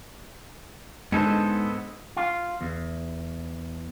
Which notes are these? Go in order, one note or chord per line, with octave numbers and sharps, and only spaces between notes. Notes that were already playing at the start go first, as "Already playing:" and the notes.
G#2 D3 G#3 B3 A4 C5
F4
E2